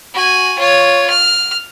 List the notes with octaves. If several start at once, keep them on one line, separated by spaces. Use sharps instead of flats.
F#4 G#5
F4 C#5
F6